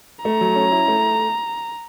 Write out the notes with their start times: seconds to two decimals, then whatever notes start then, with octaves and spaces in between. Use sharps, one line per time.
0.24 A3 A#5
0.41 F#3
0.56 C#4
0.72 E4
0.88 A3